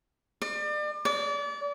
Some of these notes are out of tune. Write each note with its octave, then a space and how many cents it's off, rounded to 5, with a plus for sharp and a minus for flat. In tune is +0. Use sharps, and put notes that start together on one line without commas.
D5 +35
D5 -35